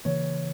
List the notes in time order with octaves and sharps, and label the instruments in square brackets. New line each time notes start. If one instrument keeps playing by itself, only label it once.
[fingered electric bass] C#3 E3 A#3 [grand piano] C#5